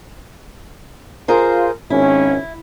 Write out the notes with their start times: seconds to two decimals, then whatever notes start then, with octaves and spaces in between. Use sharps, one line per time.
1.28 F4 G#4 A#4 C5
1.90 G#1 C#4 E4